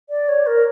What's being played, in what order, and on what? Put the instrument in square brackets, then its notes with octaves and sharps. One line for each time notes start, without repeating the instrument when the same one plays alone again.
[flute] D5
C#5
A#4